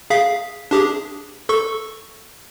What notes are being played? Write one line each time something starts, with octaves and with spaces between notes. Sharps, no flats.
G#4 F5 B6
D4 G4 G#4
A4 C#6